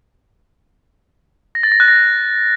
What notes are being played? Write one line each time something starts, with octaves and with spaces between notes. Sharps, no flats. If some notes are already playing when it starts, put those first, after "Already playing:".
A#6
A6
A#6
F#6
A#6